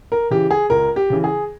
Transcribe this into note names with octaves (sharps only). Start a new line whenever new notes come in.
A#4
C#3 E3 G4
G#4
C#2 A#4
G4
C#3 E3
G#4